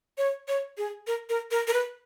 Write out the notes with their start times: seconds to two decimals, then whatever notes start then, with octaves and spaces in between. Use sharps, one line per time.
0.18 C#5
0.48 C#5
0.78 G#4
1.07 A#4
1.29 A#4
1.51 A#4
1.67 A#4
1.73 B4